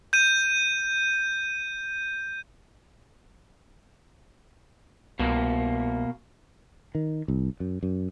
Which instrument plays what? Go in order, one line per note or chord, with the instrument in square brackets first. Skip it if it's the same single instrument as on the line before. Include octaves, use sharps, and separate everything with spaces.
[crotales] G6 D#7
[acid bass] C2 [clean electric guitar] B2 A#3
[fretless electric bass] D#3
C2
F#2
F#2